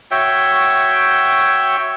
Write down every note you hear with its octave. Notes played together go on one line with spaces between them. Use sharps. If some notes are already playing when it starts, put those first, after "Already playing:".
F#4 C#5 E5 G5